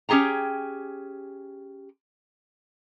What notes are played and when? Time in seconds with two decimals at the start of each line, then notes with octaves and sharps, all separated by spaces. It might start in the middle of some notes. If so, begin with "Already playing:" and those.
0.09 C#4 G4 G#4 G5 A#5